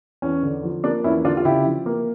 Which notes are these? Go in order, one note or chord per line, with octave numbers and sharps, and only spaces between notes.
E2 C#4
D3
F3
A#3 D4
E2 C#4 E4
D3 D4 F4
F4
C#3 E4 G4
F3
A#3